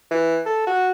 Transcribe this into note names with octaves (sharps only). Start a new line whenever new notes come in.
E3
A4
F#4